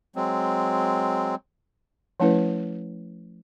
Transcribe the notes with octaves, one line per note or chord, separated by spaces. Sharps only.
F#3 G#3 C4
F3 A3 C#4 E4 B4